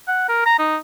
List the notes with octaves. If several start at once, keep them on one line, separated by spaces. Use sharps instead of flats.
F#5
A#4
A#5
D#4